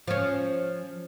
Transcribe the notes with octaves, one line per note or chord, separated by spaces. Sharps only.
F3 C#4